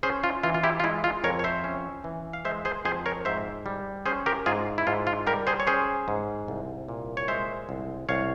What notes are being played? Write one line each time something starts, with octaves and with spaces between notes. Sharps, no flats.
C#4 G#4 C5
F4
E3 F4
F4
E4 G4
F4
G#3 E4
F4
F2 A#4 C#5
C#5
C5 E5
C#4
E3
F5
G#3 C5 E5
G#4 C5
F2 G#4 C5
A#4 C#5
G#2 C5 E5
G3
C#4 G#4 C5
G4 A#4
G#2 F4 G#4
E4
G#2 F4
F4
G3 G4 A#4
G#4 C5
C#5
C#4 G#4 C5
G#2
C2
A#2
C#5
G#3 C5 E5
C2
C2 C#5 F5